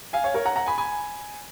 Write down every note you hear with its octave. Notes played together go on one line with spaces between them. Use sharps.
F5 G#5
C#5 F5
A#4 C#5
F#5 A#5
F#5 A#5
G#5 B5
G#5 B5